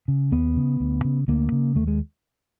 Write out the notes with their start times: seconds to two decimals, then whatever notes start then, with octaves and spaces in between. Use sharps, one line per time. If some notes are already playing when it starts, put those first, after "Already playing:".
0.08 C#3
0.32 D#2 B3
0.56 C#3
0.80 D2
1.04 C#3
1.28 D2 A#3
1.52 C#3
1.75 D#2 A3
1.87 G#3